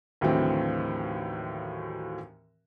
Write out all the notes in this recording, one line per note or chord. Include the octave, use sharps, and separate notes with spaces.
D#2 A2 D3 E3 F#3 C4